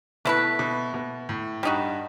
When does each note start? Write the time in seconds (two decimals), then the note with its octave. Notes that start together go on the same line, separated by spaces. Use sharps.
0.25 B2 A3 E4 B4
0.59 B2
0.94 B2
1.29 A2
1.63 G2 G3 D#4 F#4